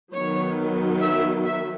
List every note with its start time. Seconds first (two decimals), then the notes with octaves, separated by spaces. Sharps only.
0.15 D#3 F#3 B3 C#5
1.02 E5
1.45 E5